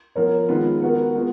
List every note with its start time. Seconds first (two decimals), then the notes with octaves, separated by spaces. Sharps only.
0.15 F3 B3 F4 A#4 C#5
0.48 D#3 G#3 B3 F4 B4
0.82 B3 F#4 A#4
1.15 G#3 B3 F4